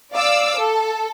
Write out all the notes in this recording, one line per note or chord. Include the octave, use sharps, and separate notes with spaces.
D5 F5 D6 E6
A4